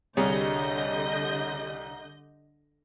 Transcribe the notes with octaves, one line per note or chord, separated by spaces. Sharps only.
C2 D3 G3 G#4 C#5 D#5 G6